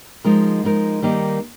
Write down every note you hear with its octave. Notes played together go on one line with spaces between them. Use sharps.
F3 G#3 D#4 A#4
F3 G#3 D#4 A#4
D#3 G3 A#3 D#4